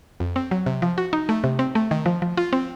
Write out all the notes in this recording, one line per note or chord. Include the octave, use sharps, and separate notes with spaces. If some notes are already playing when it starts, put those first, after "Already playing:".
F2
C4
F#3
C3
F3
F#4
D#4
A3
C3
C4
A3
D#3
F3
F3
F4
C4